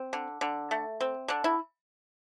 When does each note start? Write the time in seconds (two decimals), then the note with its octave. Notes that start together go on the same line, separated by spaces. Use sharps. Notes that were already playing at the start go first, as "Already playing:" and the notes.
Already playing: C4
0.13 D3
0.41 D3
0.71 A3
1.01 C4
1.28 D3 D4
1.44 E4